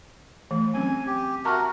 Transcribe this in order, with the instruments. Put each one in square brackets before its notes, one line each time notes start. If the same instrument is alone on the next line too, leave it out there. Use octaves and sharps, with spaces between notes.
[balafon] E3 A3
[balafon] F#3 C4 C#4 [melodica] G#5
[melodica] G4
[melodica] F#4 A#4 [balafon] E5 A5 A#5